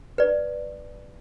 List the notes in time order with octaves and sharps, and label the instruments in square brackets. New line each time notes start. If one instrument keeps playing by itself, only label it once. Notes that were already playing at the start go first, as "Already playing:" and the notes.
[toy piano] B4 D5